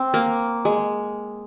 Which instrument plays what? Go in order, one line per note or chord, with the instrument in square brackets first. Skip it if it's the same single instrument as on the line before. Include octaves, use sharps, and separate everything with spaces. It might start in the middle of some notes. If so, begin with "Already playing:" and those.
Already playing: [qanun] C4
A#3
G#3